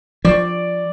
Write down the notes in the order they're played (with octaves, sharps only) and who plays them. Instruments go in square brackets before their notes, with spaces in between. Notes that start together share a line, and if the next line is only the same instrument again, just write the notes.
[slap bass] F3 [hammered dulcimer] D5